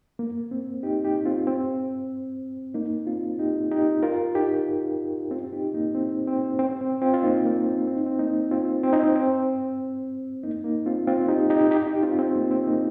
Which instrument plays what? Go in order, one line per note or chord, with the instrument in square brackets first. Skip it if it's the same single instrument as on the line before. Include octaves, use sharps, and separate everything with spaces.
[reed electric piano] A#3
C4
D#4 G4
D#4 G4
C4 F4
C4
A#3 D#4
C4 F4
D#4 G4
D#4 G4
F4 A#4
D#4 G4
C4 F4
D#4 G4
A#3 D#4
C4
C4
C4
C4
C4 F4
F4
A#3 D#4
A#3
C4
C4
D#4
C4
A#3 D#4
C4 F4
C4
D#4
C4
C4
A#3 D#4
A#3 D#4
C4 F4
C4 F4
D#4 G4
D#4 G4
D#4 G4
D#4 G4
C4 F4
C4
A#3
C4
A#3 D#4